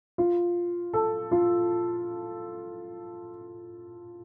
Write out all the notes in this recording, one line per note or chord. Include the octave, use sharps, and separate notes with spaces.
F4
A4
F4